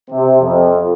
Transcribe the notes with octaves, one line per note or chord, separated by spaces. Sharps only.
C3
F2